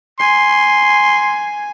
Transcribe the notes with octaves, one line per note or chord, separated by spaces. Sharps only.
G#5 C6